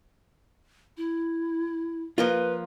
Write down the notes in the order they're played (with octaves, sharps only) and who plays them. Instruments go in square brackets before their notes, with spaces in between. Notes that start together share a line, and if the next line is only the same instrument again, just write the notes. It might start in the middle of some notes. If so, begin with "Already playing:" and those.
[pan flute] E4
[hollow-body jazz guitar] F3 A#3 F4 [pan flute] B4